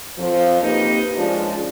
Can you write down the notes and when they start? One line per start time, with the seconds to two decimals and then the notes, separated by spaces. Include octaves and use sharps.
0.19 F2 F3
0.62 C3 A#3 D#4 G4 A#4 B4
1.17 F3 G#3 C#4 D4 F4